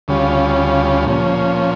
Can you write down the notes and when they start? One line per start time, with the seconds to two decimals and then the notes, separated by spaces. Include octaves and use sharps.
0.08 D2 C#3 G3 C#4 F4
1.06 A#2 F3 C#4